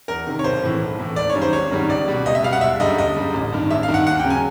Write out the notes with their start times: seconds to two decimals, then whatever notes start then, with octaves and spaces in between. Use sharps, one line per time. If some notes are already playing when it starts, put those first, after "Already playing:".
0.08 E2 A#4
0.27 C3 D#3
0.39 C#5
0.44 B1 C5
0.63 A2 E3
0.81 B1
0.99 A2 E3
1.16 G#1 D5
1.30 C#5
1.35 F#2 D#3 G3
1.42 C5
1.53 G#1 C#5
1.71 F#2 D#3 G3
1.89 C#2 D5
2.08 B2 G3
2.25 C#2 D#5
2.35 E5
2.43 B2 G3 F5
2.53 F#5
2.61 F#1 E5
2.80 F#2 D3 G3 D#5
2.98 F#1 D#5
3.16 F#2 D3 G3
3.34 A1
3.52 G2 D#3
3.70 A1 E5
3.83 F5
3.88 G2 D#3
3.94 F#5
4.07 D#2 F#5
4.19 G5
4.24 C#3 F#3
4.30 G#5